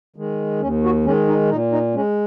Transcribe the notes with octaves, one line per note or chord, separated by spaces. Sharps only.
D#3 G#3
D#2 C#4
F#4
D#3 G#3 C#4
D#4
A#2 D#4
D#4
G#3 C#4